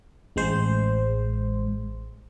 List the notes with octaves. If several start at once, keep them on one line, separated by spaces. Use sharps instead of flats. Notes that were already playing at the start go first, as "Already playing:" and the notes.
A1 G#3 C5